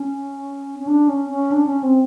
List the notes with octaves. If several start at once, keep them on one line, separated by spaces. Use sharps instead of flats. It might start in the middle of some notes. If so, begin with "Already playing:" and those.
Already playing: C#4
C#4
D4
C#4
C#4
D4
C#4
C4